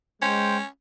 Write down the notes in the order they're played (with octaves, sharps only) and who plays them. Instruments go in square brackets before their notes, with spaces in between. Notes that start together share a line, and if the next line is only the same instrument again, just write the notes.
[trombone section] G#3 [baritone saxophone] C#4 [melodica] C5 G5